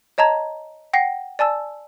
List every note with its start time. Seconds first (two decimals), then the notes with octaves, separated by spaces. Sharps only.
0.18 C#5 D#5 A5 A#5 G#6
0.93 F#5 G5 A#6 C7 C#7
1.39 D5 G#5 A5 E6